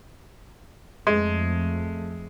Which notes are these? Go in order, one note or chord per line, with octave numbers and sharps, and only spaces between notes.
F2 G#3 A3